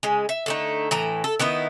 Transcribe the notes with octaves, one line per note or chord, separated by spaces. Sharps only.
C#3 G#3
E5
D3 A3 D#4
A2 E3 A#5
A4
D#3 B3 D#4 E4